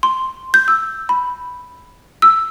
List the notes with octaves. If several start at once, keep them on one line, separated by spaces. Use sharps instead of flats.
C6
G6
E6
B5
E6